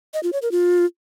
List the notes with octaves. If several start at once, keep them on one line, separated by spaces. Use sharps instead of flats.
D#5
F4
C#5
A#4
F4